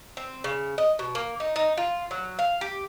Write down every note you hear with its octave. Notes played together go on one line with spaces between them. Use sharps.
C4
C#3
D#5
B2
A#3
D#4
D#4
F4
F#3
F5
G4